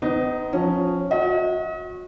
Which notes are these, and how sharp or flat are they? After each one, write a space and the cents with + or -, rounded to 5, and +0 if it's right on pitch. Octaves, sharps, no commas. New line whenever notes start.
B3 +40 D#4 +0
F3 +20 C#4 +0
F#4 -30 D#5 +40